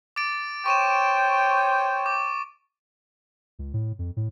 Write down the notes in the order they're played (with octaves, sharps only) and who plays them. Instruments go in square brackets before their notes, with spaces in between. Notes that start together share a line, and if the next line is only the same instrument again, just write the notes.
[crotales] D6 A6 D7
[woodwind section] C5 C#5 G5 [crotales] C#6 D#7 E7
[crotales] D6
[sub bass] C#2
A2
F2
A2